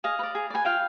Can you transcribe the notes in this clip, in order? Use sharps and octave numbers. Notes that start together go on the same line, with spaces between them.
G#4 D#5 F5
B4
D5
G#4
D5
B4 G#5
F4 F5 G5